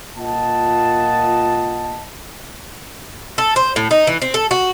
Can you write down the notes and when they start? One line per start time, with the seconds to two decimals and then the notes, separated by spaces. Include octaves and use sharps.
0.17 A#2 F4 D#5 F#5 A5
3.38 A4
3.56 C5
3.76 A2
3.91 D#4
4.07 E3
4.22 C4
4.34 A4
4.51 F#4